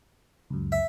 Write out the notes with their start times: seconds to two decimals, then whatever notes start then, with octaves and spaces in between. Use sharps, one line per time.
0.50 C#2 F#2
0.72 E5